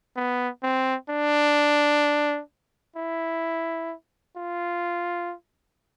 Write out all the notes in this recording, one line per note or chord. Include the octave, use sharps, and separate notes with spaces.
B3
C4
D4
E4
F4